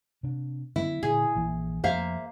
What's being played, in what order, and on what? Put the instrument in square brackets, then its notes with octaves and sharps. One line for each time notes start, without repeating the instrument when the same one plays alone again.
[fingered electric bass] C3 D4
[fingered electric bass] D3 F#3 B3 [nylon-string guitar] E4
[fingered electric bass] A#2 D3 [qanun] G#4
[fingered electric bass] A#1 E3 A#3
[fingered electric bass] F2 F3 A3 [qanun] A#3 [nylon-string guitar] C5 E5 F5